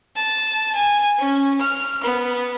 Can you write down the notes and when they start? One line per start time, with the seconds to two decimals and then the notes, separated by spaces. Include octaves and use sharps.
0.16 A5
0.75 G#5
1.19 C#4
1.61 F6
2.03 B3